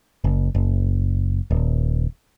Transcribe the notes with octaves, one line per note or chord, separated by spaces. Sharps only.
F#1
F#1
D#1